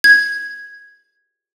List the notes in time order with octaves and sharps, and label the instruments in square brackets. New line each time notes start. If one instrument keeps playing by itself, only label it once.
[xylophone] G#6